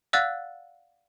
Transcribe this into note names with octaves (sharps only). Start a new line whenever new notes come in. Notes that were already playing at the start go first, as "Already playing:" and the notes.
D5 F5 F#5 E6 F#6 A6